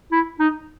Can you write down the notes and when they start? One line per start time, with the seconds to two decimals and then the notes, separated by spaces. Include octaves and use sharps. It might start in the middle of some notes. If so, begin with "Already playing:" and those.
0.12 E4
0.39 D#4